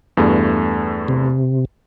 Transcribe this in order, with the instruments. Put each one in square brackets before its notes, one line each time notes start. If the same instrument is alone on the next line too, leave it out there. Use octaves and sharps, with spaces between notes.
[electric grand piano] E2 G2 A3
[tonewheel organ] C3